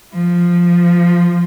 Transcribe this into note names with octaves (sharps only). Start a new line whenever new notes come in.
F3